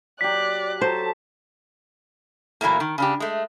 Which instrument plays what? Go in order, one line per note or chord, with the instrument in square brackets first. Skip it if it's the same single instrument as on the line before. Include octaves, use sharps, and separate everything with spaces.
[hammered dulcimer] F#3 G4 [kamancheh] D5 F#6 [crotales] B6
[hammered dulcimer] F#3 A4 [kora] C5 [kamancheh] A5
[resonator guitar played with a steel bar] A#2 E3 F#3 A3 A#3
D#3
C#3 D4 G4
G#3 A3